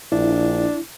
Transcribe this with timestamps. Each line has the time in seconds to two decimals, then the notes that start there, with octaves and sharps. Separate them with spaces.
0.12 A#1 D4 E4